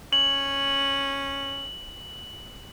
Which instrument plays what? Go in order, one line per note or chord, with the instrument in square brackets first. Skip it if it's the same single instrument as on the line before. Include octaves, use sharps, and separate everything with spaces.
[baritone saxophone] C#4 [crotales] F#7